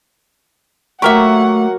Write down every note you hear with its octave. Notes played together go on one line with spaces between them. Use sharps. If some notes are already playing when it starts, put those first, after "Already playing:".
F#3 A3 A#3 G4 A#4 E5 F#5 C#6